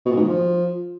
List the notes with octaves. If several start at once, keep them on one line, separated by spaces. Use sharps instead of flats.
B2
A#2
G#2
D#3
F3